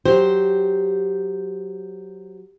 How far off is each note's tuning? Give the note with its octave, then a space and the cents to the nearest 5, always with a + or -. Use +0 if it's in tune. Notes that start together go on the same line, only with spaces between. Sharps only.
F#3 +0 G4 +0 C5 +0